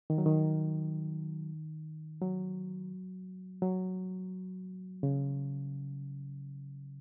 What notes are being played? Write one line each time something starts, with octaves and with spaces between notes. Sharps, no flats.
D#3
F#3
D#3
F#3
F#3
C#3